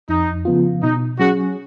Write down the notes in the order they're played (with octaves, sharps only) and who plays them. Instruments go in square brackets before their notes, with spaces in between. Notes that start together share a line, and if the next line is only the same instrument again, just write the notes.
[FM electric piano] F2 [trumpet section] D#4
[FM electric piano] C#3 F3 B3 F4
[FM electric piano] B2 [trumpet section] D#4
[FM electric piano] F#3 C#4 G#4 [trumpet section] F#4